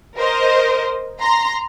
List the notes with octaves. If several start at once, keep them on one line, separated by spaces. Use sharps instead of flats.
A#4 C5 D#5
A#5 C6